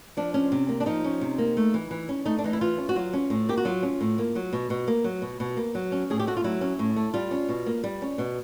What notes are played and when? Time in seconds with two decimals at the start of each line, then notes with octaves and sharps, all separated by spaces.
0.17 F3 D4
0.34 C#4
0.52 C3
0.69 A#3
0.80 D4
0.86 F3 D#4
1.04 C#4
1.21 C3
1.38 A#3
1.57 A3
1.74 E3
1.91 E3
2.09 C#4
2.26 A3 D#4
2.38 D4
2.44 E3 D#4
2.53 E4
2.61 E3 F4
2.78 C#4
2.89 F#4
2.96 F#3 F4
3.13 C#4
3.30 A2
3.49 A#3 G4
3.57 F#4
3.65 F#3 F4
3.83 C#4
4.01 A2
4.18 A#3
4.35 F#3
4.53 B2
4.70 B2
4.88 A#3
5.04 F#3
5.22 B2
5.40 B2
5.57 A#3
5.75 F#3
5.92 C#4
6.10 A2 G#4
6.20 G4
6.27 A3 F#4
6.37 F4
6.44 F#3 E4
6.61 C#4
6.79 A2
6.96 A3
7.14 G3 F4
7.31 C#4
7.49 B2
7.66 A#3
7.84 G3
8.02 C#4
8.18 B2